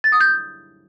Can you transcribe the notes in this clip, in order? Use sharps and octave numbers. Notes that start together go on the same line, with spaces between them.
A6
D#6
G6